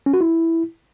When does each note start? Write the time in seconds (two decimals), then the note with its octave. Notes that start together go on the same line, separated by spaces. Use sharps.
0.06 C#4
0.14 F#4
0.21 E4